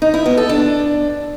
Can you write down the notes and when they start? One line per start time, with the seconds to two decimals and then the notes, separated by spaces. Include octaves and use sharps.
0.02 D#4
0.14 E4
0.26 B3
0.38 A4
0.49 D4